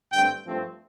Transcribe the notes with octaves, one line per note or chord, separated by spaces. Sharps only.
G2 D3 A3 C4 G5
G2 F3 A3 C4